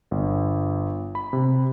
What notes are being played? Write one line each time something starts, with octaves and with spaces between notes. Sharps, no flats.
G1
B5
C3